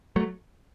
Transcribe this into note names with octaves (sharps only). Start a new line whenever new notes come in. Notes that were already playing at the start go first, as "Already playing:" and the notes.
F#3 A3